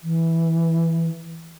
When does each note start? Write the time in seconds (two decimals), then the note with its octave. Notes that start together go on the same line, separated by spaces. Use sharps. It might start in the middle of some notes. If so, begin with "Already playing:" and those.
0.03 E3